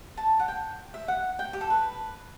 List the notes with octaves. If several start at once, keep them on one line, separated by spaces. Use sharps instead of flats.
A5
F#5
G5
E5
F#5
G5
G4
A4
B4